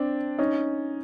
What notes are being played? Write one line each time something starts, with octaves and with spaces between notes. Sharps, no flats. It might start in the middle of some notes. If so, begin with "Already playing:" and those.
Already playing: C4 D4
C#4 D#4